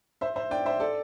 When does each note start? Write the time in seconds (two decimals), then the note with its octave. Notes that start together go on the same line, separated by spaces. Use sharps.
0.21 C5 E5
0.36 C5 E5
0.51 D5 G5
0.66 C5 E5
0.80 A4 D5